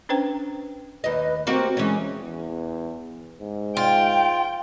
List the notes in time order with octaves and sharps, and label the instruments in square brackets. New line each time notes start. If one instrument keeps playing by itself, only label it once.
[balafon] C#4 D4 B4 C5 G5 A#5
[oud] D#2 D#5 [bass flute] B4
[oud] A#3 F#4 G4 [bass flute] C4
[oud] E3 C#4 [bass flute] G#3
[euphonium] E2
G#2
[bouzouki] F4 [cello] G5